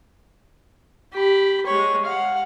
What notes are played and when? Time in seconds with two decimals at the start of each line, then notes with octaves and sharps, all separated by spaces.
1.13 G4 B5
1.66 G#3 C#5
2.05 F5 F#5